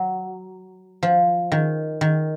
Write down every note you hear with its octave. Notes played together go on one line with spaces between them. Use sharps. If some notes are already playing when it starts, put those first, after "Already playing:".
Already playing: F#3
F3
D#3
D#3